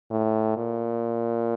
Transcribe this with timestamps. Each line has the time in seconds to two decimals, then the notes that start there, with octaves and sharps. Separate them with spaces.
0.10 A2
0.57 A#2